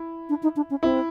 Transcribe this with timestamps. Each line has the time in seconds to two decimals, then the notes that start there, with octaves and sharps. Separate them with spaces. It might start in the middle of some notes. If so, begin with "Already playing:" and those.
Already playing: E4
0.29 D4
0.43 D#4
0.56 D4
0.70 C#4
0.83 C4 E4